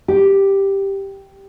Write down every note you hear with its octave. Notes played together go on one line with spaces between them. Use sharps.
G4